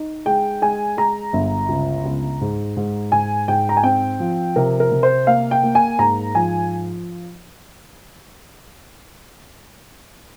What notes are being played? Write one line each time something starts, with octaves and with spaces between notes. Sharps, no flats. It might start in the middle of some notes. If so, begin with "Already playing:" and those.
Already playing: D#4
G#3 G5
G#3 G#5
G#3 A#5
G1
C#2
C#2
G#2
G#2
G#2 G#5
G#2 G5
A#5
G#5
C4 G5
F3
C3 A#4
A#4
C3
C5
A#3 F5
G5
A#3
G#5
G#2 A#5
F3 G#5